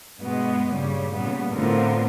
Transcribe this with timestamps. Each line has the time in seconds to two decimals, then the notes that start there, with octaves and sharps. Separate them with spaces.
0.18 G2 B2 G#3 B3
0.72 G2 A#2 C#3 G3
1.14 A#2 C#3 G3 B3
1.52 A2 D3 B3 C4 F4 A#4